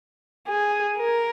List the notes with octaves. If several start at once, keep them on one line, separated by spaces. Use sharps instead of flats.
G#4
A#4